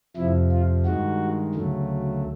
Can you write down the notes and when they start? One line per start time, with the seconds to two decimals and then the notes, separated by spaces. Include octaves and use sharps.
0.16 F2 C3 F3 E4
0.52 F4
0.85 G2 D#3 G#3 F#4
1.55 D2 C#3 F#3 A3